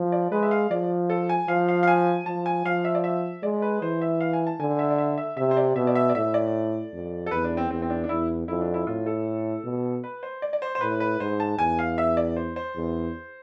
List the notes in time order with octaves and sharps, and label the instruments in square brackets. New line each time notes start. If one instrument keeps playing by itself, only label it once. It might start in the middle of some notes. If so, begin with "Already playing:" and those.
Already playing: [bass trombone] F3
[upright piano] D5
[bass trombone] G#3 [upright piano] B4
[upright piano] E5
F5
[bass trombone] F3 [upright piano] D5
[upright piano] A4
G#5
[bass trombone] F3 [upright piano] F5
[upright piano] F5
F5
G#5
[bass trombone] F3 [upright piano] A5
[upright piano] G#5
[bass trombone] F3 [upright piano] F5
[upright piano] E5
D5
E5
[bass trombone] G#3 [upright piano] D5
[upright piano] B4
[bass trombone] E3 [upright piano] C5
[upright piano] E5
F5
G#5
A5
[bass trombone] D3 [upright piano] G#5
[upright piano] E5
D5
E5
E5
[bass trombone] C3 [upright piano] E5
[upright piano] C5
D5
[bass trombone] B2 [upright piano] E5
[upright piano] D5
E5
D5
[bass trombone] A2 [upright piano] E5
[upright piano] D5
[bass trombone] F2
[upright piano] A4
[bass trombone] E2 [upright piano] B4
[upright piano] D4
C4
[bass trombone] E2 [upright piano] C4
[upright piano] C4
D4
D4
[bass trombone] E2 [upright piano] E4
[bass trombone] F2 [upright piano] E4
[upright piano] D4
E4
[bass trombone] A2 [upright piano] F4
[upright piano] A4
[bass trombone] B2
[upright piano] B4
C5
D5
D5
C5
C5
[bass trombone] A2 [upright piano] B4
[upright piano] B4
[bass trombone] G#2 [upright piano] C5
[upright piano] A5
[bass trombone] E2 [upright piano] G#5
[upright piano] F5
E5
D5
C5
C5
[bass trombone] E2